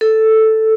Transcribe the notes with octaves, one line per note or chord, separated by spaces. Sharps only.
A4